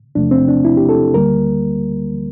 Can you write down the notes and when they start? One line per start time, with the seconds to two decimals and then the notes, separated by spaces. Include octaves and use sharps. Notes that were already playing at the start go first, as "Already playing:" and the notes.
0.15 E2 C3 F3 A3 D4
0.31 C4
0.48 D4
0.65 E4
0.77 G4
0.89 A4
1.14 D2 D3 G3 A#3 A#4